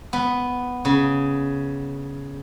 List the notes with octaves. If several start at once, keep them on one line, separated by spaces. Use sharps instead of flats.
B3
C#3